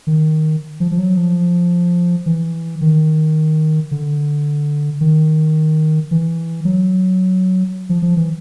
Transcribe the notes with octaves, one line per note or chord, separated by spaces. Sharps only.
D#3
F3
F3
F#3
F3
E3
D#3
D3
D#3
E3
F#3
F3
F3
E3